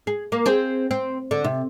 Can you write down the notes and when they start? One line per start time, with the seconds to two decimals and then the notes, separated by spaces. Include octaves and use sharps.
0.07 G#4
0.32 A#3
0.46 C4 G#4 C5
0.91 C4
1.31 D3
1.44 C3